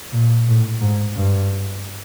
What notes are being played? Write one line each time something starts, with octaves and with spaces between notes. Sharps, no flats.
A#2
A2
G#2
G2